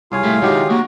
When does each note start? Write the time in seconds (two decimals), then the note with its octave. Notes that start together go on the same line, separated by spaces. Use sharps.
0.12 C2 F4 G#4 C#5 F5 G#5
0.24 A3 E4 G4
0.42 D#3 F#3 G#3 E4 G4 G5
0.70 A#3 D4 F#4